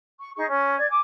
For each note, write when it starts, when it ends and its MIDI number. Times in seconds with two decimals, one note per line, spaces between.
0.18 0.28 85
0.35 0.44 63
0.35 0.44 68
0.35 0.44 85
0.47 0.72 61
0.76 0.88 74
0.76 0.88 92
0.88 1.00 80
0.88 1.00 86